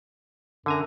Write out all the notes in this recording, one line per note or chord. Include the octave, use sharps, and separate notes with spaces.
F#2 D3 G#5 A#5